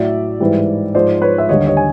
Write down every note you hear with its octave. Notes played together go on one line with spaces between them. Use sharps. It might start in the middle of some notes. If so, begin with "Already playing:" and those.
Already playing: A2 F#3 D5 E5
G#2 E3 G3
G#2 F3 G#3 C5 D5
B4 C#5
E5
D#2 D3 G3 C#5 D#5
C#5 D#5
G#5